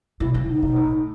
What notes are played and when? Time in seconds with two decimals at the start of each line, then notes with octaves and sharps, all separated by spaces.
0.20 B2 E4
0.34 C#3
0.49 D#4
0.62 B2
0.76 A2